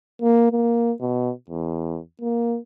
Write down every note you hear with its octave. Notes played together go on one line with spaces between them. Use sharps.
A#3
A#3
B2
E2
A#3